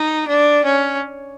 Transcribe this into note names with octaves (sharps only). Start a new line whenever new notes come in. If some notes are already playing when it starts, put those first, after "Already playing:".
Already playing: D#4
D4
C#4